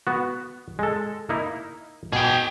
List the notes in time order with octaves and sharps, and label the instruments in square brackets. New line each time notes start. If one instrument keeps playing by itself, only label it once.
[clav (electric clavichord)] B3 F#4
G#3 A4
A#3 D#4 E4
[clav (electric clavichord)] B2 [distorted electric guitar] G#4 G5